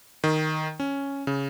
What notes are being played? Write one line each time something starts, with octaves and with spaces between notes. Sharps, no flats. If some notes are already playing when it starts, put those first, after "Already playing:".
D#3
C#4
C#3